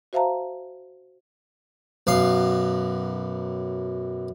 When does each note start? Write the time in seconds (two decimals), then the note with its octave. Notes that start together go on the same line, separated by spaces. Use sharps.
0.13 F#4 C5 E5 F5 A5 A#5
2.07 B1 F#2 F5